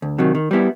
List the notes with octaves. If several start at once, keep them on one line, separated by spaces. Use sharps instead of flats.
D2
C3 D#3 F#3
D#3
G3 B3 E4